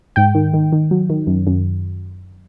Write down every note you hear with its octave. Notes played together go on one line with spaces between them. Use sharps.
G#2 G5
D#3
D#3
D#3
F#3
D#3
F#2
F#2